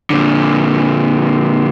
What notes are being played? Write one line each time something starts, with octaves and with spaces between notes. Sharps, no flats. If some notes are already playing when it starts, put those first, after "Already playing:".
A#2 D3